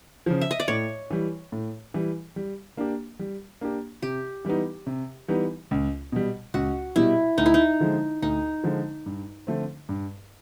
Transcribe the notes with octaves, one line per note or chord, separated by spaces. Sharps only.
C#3 F3
E5
D#5
D5
A2 C#5
E3 G3
A2
E3 G3
G3
A#3 D4 G4
G3
A#3 D4 G4
C3 G4
E3 G3 B3 D#4
C3
E3 G3 B3 D#4
C#2
B2 G3
C#2 F#4
B2 G3 E4
D2 D#4
E4
D#4
D3 F3 G#3
D2 D#4
D3 F3 G#3
G2
D3 F3 A3 C4
G2